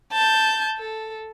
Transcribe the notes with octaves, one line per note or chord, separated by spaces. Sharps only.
A5 G6
A4